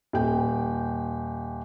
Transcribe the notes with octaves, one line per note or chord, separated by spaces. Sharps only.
D#1 G5